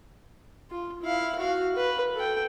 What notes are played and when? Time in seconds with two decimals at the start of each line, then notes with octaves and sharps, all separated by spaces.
0.70 F4
1.02 E4 F5
1.39 F#4 F5
1.76 B4
2.15 A4 G5